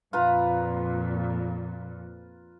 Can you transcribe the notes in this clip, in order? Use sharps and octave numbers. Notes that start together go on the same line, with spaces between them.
F2 A#2 F4 B4 A#5